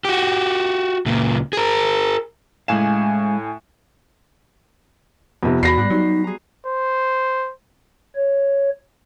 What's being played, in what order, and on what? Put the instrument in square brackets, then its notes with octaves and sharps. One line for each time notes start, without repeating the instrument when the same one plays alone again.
[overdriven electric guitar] F#4 G4
C#2 A#2
G#4 A#4
[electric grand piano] A2 G#5 E7 [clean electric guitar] G#3 F5
[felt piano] F2 C3 [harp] B3 D#4
[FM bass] E2 [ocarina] F#4 [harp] D5 [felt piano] B5 A#6 C7
[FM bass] G#2 [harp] G3 F#6
[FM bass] F#3 [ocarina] D#4 [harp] F#4 G4 C6
[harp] G#4 A#5
[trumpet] C5
[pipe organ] C#5